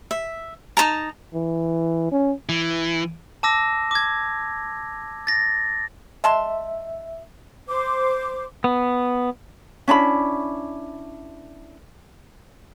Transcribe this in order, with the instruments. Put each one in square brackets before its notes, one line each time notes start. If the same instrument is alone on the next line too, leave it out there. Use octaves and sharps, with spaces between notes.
[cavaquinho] E5
D#4 B4 A5 A#5
[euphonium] E3
C#4
[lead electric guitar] E3
[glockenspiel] A5 D6 E6 A#6
D6 G#6
A6 A#6
[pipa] G#3 A5 C6 [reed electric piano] E5
[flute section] C5 D6
[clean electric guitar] B3
[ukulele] C#4 D4 E4 B5